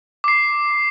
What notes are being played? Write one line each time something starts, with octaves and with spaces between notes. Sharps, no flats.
D6 C7